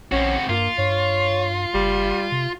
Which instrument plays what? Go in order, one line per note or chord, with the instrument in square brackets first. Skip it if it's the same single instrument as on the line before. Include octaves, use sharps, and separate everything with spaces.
[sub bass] A#1 [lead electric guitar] C4 F#4 [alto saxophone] C#4
[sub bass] G2 [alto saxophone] A#3 [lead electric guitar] F4
[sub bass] G2 [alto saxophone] C#5
[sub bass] F#1 [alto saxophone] G3
[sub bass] C3